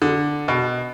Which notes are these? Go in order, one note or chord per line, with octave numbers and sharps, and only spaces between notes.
D3
B2